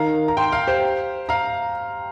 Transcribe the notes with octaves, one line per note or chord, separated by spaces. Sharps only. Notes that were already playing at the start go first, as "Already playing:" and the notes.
Already playing: D#3 F5 A#5
A#5
G5 C6
F5 A#5
G4 C5
F5 A#5